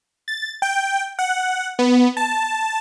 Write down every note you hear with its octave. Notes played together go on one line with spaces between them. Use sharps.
A6
G5
F#5
B3
A5